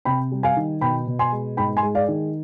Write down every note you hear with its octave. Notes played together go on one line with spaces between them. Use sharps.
C3 G5 B5
G3
F5 G#5
D#3
B2 G5 B5
B2
G#5 C6
G#3
G#2 G5 B5
G#5 C6
G#3
D5 F5
D#3